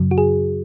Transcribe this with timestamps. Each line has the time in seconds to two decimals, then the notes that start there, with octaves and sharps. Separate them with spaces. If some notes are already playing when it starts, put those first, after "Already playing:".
Already playing: F#2 C#3 F#3
0.11 F#4
0.18 G#4